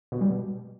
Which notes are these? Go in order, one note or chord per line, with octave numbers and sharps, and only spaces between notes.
B2
G3
B2